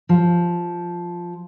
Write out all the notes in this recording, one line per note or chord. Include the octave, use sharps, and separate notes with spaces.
F3